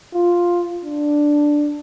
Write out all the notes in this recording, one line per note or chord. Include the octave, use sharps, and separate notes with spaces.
F4
D4